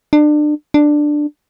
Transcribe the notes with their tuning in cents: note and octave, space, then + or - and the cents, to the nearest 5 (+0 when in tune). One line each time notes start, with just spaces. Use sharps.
D4 +30
D4 +10